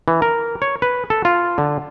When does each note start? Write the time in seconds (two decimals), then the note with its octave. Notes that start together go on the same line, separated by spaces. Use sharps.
0.08 E3
0.22 A#4
0.62 C#5
0.82 B4
1.10 A4
1.25 F4
1.58 D3